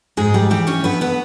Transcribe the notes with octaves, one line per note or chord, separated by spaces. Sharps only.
G#2 G#3 G#4
G3 G4
E3 G3 G4
C#4 C#5
G2 B3 B4
B3 B4